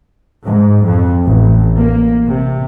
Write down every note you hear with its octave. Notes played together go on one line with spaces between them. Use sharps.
G#2
F2
A1
A#3
C3